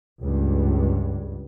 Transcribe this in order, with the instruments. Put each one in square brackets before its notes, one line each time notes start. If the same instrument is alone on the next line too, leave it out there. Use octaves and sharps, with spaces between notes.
[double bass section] C#2 G2